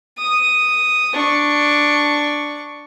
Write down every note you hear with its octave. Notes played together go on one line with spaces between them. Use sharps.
D#6
D4 C#6